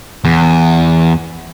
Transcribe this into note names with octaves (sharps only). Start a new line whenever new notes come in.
E2